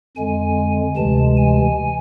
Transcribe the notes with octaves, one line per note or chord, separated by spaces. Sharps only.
F2 D3 G#3 G#5
D2 C3 E3 G#3 A5
G#5